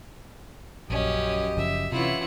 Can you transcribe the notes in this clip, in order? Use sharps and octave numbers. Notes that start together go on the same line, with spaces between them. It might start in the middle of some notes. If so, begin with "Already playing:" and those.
A#1 F#2 C#4 G4 D#5
F#1 C#3 F3 E5
C3 E3 C#4 E4 F4 F#5